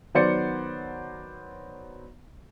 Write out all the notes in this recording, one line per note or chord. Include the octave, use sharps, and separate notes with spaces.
D#3 F#3 B3 C5 D5 C#7